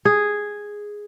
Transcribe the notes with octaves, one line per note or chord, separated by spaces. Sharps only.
G#4